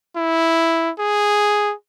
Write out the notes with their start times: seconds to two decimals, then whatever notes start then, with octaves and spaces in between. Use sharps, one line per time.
0.16 E4
0.99 G#4